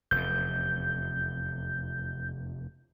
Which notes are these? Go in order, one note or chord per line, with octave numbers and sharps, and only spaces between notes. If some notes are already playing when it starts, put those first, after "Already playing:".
F1 E2 G6